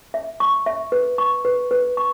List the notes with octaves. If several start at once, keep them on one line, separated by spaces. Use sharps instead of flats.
E5
C#6
E5
B4
C#6
B4
B4
C#6